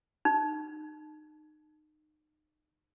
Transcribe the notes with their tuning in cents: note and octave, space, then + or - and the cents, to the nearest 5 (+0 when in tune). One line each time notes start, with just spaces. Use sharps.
D#4 -25